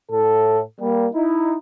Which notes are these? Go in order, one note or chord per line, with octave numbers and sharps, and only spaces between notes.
A2 A4
G3 A#3
D#4 E4